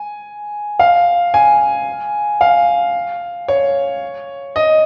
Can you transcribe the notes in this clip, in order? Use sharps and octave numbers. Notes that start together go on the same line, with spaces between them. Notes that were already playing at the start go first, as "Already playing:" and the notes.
Already playing: G#5
F5
G#5
F5
C#5
D#5